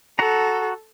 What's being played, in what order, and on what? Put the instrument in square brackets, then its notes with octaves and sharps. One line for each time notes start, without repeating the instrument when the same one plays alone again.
[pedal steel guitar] F#4 F#5 A#5 [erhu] A4